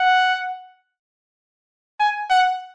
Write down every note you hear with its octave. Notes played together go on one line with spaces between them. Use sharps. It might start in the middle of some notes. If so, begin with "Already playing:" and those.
Already playing: F#5
G#5
F#5